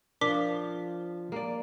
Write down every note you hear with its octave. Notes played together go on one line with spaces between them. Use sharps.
F3 D4 A#4 D6 B6
A#3 D5